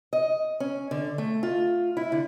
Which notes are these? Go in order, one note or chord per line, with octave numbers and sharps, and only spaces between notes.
D#5
C#4
D3
A3
F4
E4
D3